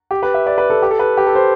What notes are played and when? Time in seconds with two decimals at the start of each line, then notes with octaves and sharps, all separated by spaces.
0.11 G4
0.23 B4
0.34 E5
0.47 D5
0.58 B4
0.70 A4
0.82 G4
0.91 A4
0.99 B4
1.17 G4
1.27 A4
1.35 C5